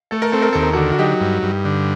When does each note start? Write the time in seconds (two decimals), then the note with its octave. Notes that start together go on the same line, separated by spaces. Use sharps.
0.11 A3 A4
0.22 A#4
0.32 C4 A4
0.42 A#4
0.53 D#2 A4
0.63 A#4
0.73 F#4 A4
0.77 D3
0.93 F#4
0.99 F#3 D#4 G4
1.21 G2
1.43 G2
1.65 D3